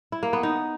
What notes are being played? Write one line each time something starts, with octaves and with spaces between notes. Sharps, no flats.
E4
A#3
B3
D#4